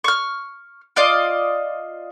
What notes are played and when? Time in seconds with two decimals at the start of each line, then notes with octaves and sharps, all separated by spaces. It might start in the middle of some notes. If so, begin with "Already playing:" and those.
0.04 C#6 F6
0.96 F4 D5 D#5 F5